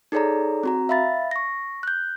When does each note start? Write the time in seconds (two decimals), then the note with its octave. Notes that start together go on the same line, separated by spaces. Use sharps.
0.12 D#4 G#4 A4 C#5 D5 A#5
0.63 C4 F#4 A#5
0.89 E5 F5 B5 A6
1.31 C#6 A#6
1.83 F#6 G6